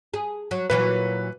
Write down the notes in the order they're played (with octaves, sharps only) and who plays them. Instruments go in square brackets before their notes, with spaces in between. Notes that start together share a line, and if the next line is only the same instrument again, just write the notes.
[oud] G#4
F#3
[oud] A#2 E3 F#3 [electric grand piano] B4